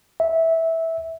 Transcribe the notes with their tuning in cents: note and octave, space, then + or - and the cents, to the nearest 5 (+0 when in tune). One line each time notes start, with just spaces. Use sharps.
E5 -15